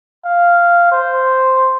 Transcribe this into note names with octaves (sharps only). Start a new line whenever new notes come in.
F5
C5